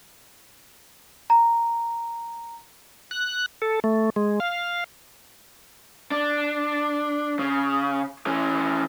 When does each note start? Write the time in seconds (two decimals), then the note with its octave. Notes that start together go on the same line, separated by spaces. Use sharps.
1.30 A#5
3.11 F#6
3.62 A4
3.84 A3
4.16 G#3
4.40 F5
6.11 D4
7.39 C#3
8.27 E3 C#4